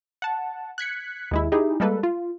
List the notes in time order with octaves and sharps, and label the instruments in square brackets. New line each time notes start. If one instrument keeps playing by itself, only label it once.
[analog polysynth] F#5 A5
F#6 G#6 B6 C#7
D#2 G#3 E4
D#4 E4 G4 G#4
G3 G#3 A#3 A4 B4
F4